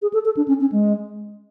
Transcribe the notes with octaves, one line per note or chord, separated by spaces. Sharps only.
G#4
A4
A4
D4
C#4
C#4
G#3